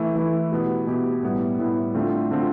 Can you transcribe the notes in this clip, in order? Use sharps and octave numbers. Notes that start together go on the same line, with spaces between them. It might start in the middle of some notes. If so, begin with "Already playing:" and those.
Already playing: E3 A3 E4
E3 A3 E4
B2 B3 E4 G4
B2 B3 E4 G4
A2 G3 B3 E4
A2 G3 B3 E4
D3 A3 C4 F4
D3 A3 C4 F4